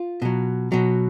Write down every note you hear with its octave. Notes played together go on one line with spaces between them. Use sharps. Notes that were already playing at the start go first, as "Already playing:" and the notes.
Already playing: F4
B2 F#3
B2 F#3